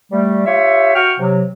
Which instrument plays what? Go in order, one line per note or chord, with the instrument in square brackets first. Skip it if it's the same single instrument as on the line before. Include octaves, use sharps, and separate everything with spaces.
[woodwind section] G3 A3
F4 G4 C#5 E5
F#4 G5 C#6 F6
C3 F#3